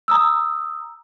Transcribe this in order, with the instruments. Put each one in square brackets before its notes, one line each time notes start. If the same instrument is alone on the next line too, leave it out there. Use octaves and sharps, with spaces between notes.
[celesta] A#5 D#6 E6